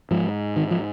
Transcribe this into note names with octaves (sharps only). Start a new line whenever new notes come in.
G#2 F3
D#3
F3